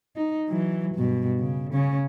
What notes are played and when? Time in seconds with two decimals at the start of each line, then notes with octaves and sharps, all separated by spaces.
0.16 D#4
0.49 E3 F#3
0.95 G2 B2
1.40 C#3
1.73 C#3 C#4